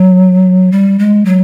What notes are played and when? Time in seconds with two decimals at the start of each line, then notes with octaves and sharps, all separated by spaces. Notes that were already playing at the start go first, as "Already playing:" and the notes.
Already playing: F#3
0.72 G3
0.99 G#3
1.25 F#3